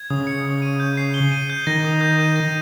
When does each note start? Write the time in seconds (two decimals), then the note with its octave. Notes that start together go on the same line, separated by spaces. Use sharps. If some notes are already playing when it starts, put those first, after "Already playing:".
Already playing: G#6
0.10 C#3 D#6
0.27 C#7
0.45 D#6
0.62 D#7
0.80 G6
0.97 C7
1.14 G7
1.31 D#7
1.50 G6
1.67 D#3 A#6
1.84 D#6
2.01 G6
2.19 D#7
2.36 A#6